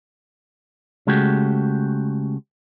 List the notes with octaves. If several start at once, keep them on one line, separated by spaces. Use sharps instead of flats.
C#3 G#3 A3 F#4 G4